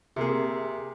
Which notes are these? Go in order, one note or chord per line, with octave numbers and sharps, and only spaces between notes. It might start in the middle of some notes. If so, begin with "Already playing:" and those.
C3 A#3 G#4